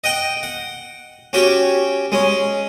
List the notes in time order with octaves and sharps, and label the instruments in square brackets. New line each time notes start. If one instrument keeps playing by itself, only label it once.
[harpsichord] D#5 F#5 G5
F#5
C#4 F#4 G4 C#5
G#3 C#4